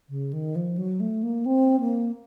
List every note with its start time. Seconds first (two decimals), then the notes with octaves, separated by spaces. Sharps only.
0.09 C#3
0.33 D#3
0.56 F3
0.77 F#3
1.00 A3
1.23 A#3
1.46 C4
1.80 A#3